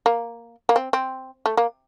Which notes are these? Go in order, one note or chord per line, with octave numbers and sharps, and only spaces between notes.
A#3
A#3
C4
C4
A3
A#3